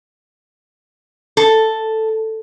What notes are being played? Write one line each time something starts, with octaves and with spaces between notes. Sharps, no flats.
A4